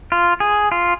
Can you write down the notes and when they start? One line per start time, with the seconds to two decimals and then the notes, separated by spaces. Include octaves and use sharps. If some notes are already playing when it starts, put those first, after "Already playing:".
0.12 F4
0.40 G#4
0.72 F4